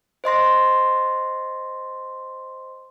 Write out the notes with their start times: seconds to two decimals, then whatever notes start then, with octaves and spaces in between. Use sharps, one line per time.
0.24 C5 D#5 C6 A#6